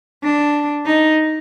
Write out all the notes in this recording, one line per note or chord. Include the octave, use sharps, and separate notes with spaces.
D4
D#4